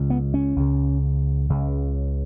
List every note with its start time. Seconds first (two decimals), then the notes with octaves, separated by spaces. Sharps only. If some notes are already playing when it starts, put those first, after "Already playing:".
Already playing: C#2 C#3
0.10 B3
0.34 C#4
0.56 C#2 C#3
1.50 C#2 C#3